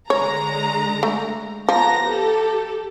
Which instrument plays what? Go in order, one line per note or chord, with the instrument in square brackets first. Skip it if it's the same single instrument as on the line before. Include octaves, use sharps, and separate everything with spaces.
[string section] D3 G#3 A#5 [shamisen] C#5
[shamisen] A3
[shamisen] F3 [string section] B3 A#5 A#6
[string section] G4 A4